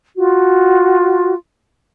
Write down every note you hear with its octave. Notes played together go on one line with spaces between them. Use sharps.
F4 F#4